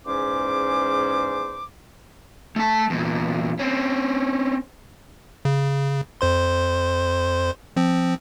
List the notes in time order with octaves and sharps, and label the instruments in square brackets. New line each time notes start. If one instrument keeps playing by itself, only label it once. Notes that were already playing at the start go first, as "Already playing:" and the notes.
[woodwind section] E2 G#2 C#4 C5 D6
[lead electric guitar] A3 A5
E2 A#2
C4 C#4
[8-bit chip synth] C#3
F2 C5 C6
F3 C4